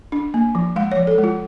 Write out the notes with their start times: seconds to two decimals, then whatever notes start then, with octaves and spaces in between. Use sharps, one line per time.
0.12 D4
0.34 A#3
0.55 F3
0.76 G#3 F5
0.92 C#5
0.97 F3
1.07 A4
1.18 G#3
1.24 F4